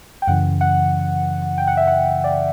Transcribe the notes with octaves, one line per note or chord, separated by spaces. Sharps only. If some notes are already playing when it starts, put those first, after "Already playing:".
G5
F#2 C#3 E3 F#5
F#5
G5
F#5
E5
F#5
D5